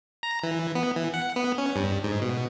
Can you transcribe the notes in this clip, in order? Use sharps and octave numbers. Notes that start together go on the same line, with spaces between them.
A#5
E3
B3
E3
F#5
B3
C#4
G2
G#2
B2